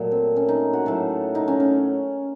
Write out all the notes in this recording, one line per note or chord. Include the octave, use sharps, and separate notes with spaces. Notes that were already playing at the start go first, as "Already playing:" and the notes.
Already playing: A#2 F#3 A3
C4
C#4
D#4
F#4
A2 F#3 A3 A4
D#4
C#4
C#4